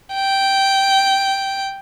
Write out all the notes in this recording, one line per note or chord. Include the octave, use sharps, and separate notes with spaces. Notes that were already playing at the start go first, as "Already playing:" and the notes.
G5